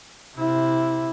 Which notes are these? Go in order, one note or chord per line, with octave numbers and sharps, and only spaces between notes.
C3 E4